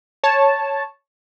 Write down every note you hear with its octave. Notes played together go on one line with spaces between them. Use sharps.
C#5 A5